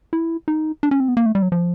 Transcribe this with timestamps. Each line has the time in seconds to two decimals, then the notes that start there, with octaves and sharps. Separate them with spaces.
0.13 E4
0.48 D#4
0.83 D4
0.91 C#4
1.00 C4
1.08 B3
1.17 A#3
1.26 A3
1.35 G3
1.42 F#3
1.52 F3